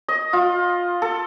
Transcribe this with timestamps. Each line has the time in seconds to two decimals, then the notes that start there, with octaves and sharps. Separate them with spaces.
0.08 D#5
0.33 F4
1.02 A4